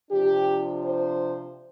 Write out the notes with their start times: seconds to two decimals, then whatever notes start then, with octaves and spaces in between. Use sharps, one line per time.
0.11 C3 F3 D4 G4
0.83 C5